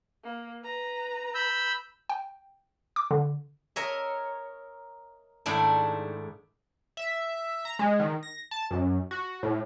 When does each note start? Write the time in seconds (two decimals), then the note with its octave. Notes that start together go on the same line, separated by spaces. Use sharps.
0.24 A#3
0.63 B4 A#5
1.35 B5 E6 G6
2.09 G5
2.96 D6
3.11 D3
3.76 A#4 C#5 D#5 E5
5.46 G#2 D#3 A3 D4 E4
6.97 E5
7.65 A#5
7.79 G#3
8.00 D#3
8.23 A#6
8.51 A5
8.71 F#2
9.11 F#4
9.43 A2